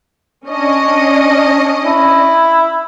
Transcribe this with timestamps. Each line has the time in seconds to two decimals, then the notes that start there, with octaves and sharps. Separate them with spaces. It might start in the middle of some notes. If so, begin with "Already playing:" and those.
0.47 C#4 D4 D#5
1.85 E4